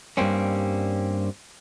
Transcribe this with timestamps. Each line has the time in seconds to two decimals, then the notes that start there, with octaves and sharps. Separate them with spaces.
0.17 G2 G3 A#3 C4 C#4